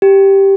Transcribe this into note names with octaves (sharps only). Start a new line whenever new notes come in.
G4